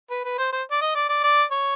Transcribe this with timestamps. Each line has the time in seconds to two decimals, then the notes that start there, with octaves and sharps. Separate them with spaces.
0.10 B4
0.25 B4
0.38 C5
0.52 C5
0.71 D5
0.81 D#5
0.95 D5
1.09 D5
1.24 D5
1.52 C#5